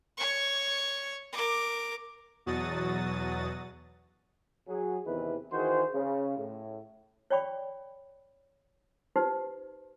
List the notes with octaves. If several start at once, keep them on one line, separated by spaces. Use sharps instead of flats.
C#5 C#6
A#4 D6
E2 B2 F#3 F#4 D#6 A6
F#3 G#4
E2 C3 D#3 E3 E4 B4
D#3 E3 F#4 G#4 C5
C#3
A2
C#5 D5 G5 B5 C#6
D#4 G4 B4 C5